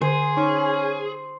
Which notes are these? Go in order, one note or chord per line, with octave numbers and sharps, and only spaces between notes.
D3 G#4 C5
C#4 D#4